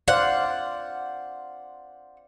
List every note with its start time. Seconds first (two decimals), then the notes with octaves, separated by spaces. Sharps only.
0.08 C5 D5 F5 F#5